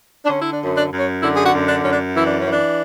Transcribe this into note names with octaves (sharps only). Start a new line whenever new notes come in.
D4
D3 C#4
E4
D4
F#2
D4
F#2
C#4
D3 E4
G#4
F#4
F#2
D4
F#2 C#4
D4
E3 E4
D4
C#4
E3
D4